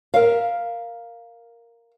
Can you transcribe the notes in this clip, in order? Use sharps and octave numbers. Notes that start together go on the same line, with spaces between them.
A#4 E5 F5